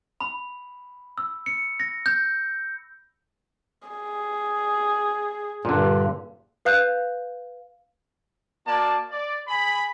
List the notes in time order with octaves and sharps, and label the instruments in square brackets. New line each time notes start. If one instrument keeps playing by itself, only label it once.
[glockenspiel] B5
E6
C#7
A#6
G6
[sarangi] G#4
[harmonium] G2 [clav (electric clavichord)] A#2 D3
[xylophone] B4 F5 F#6 G6
[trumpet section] A#3 F#4 D5 A5
D5
G#4 G#5 B5